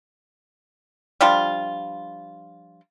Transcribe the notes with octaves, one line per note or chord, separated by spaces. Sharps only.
F3 G3 D4 F4